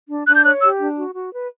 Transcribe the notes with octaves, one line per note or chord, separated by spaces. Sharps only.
D4
D4 F#6
G6
C#5 F#6
G4 E6
D4
F#4
F#4
B4